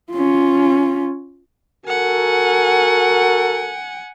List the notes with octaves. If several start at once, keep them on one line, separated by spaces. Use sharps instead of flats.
C#4 F4
F#4 A4 A#4 F#5 G#5